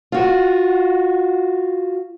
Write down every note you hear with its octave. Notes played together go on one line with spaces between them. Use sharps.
F4 F#4